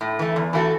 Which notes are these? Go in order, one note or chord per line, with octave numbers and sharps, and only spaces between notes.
A2
E3 A3
E2
E3 A3 F#4 A4